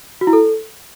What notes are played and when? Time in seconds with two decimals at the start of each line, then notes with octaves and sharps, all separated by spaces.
0.21 F#4
0.27 E4
0.33 A4